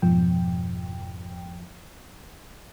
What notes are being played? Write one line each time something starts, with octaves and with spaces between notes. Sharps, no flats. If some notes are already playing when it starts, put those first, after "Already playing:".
F2 G#2 B2 F3 G5